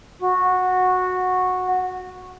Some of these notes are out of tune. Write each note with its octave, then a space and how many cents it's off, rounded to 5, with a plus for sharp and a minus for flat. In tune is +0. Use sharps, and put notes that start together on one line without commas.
F#4 -10